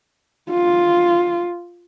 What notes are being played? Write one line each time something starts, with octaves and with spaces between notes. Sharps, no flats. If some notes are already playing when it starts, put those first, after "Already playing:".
F4